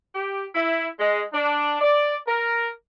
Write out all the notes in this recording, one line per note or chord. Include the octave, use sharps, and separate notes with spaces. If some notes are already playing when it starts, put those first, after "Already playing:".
G4
E4
G#3
D4
D5
A#4